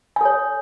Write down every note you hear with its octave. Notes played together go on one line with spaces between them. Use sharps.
A4 C#5 G#5